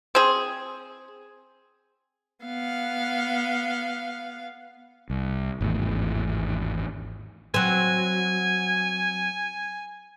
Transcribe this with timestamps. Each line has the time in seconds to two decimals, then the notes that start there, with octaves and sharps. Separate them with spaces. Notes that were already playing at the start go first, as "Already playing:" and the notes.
0.15 C4 G#4
2.45 B3 F5
5.10 C2
5.61 G#1 E2 A2
7.54 F#3 C4 G#5